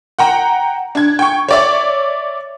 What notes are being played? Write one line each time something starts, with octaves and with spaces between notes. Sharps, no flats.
F#5 G5 A#5
D4 G#6
G5 C#6
C#5 D5 E5